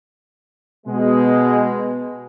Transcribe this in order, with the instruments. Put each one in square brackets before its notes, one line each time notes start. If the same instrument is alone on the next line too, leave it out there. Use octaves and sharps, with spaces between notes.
[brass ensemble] B2 G#3